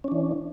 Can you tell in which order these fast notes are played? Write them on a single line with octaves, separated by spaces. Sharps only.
C#4 D4 E3